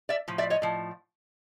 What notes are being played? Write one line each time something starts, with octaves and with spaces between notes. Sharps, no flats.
D5 E5
A2 F3
D5 E5
C#5 D#5
A2 F3